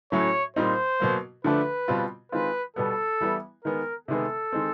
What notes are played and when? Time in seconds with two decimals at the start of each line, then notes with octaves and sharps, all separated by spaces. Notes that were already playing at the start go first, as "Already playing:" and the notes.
0.12 A2 F#3 A3 C#4 C#5
0.56 A#2 G3 C4 D#4 C5
1.00 B2 F#3 A#3
1.44 D3 F3 A3 D4 B4
1.88 B2 G3 C4 F4
2.32 D#3 G#3 C4 F4 B4
2.76 B2 G3 B3 A4
3.21 E3 G3 B3 E4
3.64 D#3 G#3 B3 A#4
4.08 C3 D#3 G#3 B3 A4
4.53 D#3 G#3 C4